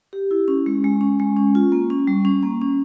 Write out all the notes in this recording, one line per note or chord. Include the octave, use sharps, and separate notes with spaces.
G4
E4
C#4
G#3
G#3
C#4
G#3
C#4
F4
A#3
C#4
G3
C#4
A#3
C#4